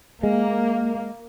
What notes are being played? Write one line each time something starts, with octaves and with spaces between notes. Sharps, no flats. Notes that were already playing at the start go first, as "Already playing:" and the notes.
G#3 A#3